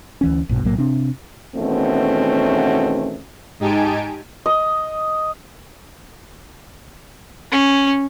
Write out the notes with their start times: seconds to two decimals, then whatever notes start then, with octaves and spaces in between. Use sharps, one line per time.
0.21 D2 E3 C#4
0.49 A#1 G2 B2
0.64 B1 A2 F#3 A#3
0.78 C3 C4 D4
1.56 E2 B2 D#3 A3 C4 C#4
3.60 G#2 D#4 G4 G#5 A5 D7
4.46 D#5
7.52 C#4